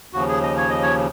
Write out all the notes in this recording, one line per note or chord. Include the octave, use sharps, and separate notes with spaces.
D#2 C#3 F3 F#4
G#4
D#5
C#5
D#5
C#5